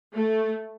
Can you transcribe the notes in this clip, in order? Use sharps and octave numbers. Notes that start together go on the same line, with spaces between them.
A3